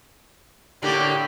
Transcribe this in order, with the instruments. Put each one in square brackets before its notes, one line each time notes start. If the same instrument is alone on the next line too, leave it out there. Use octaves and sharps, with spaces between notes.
[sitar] A2 D3 A#3 [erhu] G4